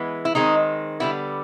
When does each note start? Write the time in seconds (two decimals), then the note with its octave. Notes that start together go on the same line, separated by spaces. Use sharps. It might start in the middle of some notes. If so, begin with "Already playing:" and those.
Already playing: E3 G#3 B3
0.25 E4
0.35 D#3 G#3 C4 D#4
1.00 D3 G3 B3 E4